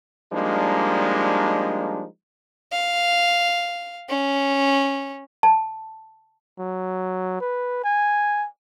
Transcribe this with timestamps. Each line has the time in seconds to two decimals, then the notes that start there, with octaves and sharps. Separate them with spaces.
0.33 F3 G3 G#3 A#3 D4 D#4
2.72 F5
4.09 C#4
5.43 A5
6.59 F#3
7.40 B4
7.84 G#5